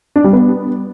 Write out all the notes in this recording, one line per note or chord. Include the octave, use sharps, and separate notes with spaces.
D4
G3
B3